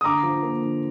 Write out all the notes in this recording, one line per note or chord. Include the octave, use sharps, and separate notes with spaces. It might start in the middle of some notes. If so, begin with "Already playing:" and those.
D#6
D3 A#5 D6
F3
A#3
D3